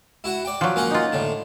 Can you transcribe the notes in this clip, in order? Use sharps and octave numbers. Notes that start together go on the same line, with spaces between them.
E4 F#4 F#5
D5 G5
F3 F#3
A#3 C#4 F#5
D#4 F4
A2 D3